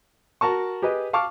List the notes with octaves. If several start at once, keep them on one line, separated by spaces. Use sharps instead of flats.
F#4 A#4 A5 C#6
G4 G#4 B4 D#5
F5 A5 C#6 D6 F6